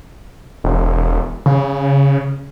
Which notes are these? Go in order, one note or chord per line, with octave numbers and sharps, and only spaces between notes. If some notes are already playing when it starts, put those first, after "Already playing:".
E1
C#3